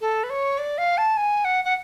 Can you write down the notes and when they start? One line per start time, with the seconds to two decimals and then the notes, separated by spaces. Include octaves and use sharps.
0.01 A4
0.24 B4
0.30 C#5
0.58 D5
0.78 F5
0.98 A5
1.17 G#5
1.45 F#5
1.65 F#5